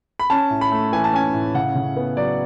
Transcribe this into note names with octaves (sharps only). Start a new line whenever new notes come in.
B5
C#4 A5
A2
B5
A3
E3 G#5
A5
C#4 G#5
A2
C#3 F#5
C#3
B3
F#3 D5